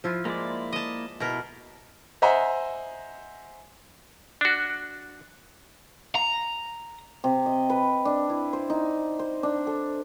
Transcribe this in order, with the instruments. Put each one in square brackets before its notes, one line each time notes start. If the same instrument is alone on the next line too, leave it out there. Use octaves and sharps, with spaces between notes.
[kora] F3 E4 F4
[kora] G#3 [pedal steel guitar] A#3 E4 D5
[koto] D#5 A5
[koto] B2 A#4 [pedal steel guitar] E4
[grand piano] C5 D#5 E5 F#5 G#5 A#5
[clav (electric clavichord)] D4 F#4
[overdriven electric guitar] A#5
[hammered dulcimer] C3
D#5
B4
D4
E4
C5
D#4
C5
D4
A4